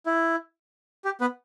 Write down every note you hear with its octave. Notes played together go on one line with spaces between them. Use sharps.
E4
G4
B3 B4